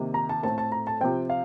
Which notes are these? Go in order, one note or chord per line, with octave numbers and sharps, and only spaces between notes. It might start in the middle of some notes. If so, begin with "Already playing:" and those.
Already playing: C3 D#3 A#3
A#5
A5
A2 A3 C4 A5
A5
A#5
A5
C3 F3 C4 G5
F5